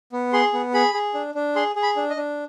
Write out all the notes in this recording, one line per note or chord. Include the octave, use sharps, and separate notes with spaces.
B3
G#4 C6
B3
G#4 B5
G#4
D4
D4
G#4 C6
G#4
B5
D4
D#5
D4